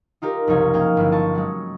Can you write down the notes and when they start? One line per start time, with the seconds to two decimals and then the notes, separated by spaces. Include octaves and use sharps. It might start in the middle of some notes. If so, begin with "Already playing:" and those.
0.22 D#4 F4 G4 A#4
0.47 F#1 C2 F3 D#4 C#5 G#5
0.73 A#3 C#4 G#4 F5 G5
0.97 G1 E4
1.12 F4 A5 C#6
1.35 F#3 G#3